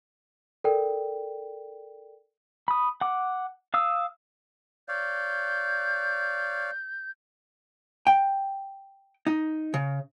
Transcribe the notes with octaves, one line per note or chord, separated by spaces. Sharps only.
A4 A#4 D5 G5
B5 D#6
F#5 D6
F5 D#6 E6
C#5 D5 F5 G6
G5
D#4
C#3